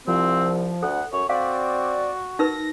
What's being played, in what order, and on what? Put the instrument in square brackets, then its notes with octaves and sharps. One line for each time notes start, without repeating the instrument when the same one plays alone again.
[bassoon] C2 [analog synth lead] F3 [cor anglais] C4
[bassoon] D2 [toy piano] A4 [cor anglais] F#5
[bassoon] F#2 [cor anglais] C#5
[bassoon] C4 [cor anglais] F#4 [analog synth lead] D5 [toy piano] F5
[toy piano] D#4 A#4 B4 [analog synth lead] A#6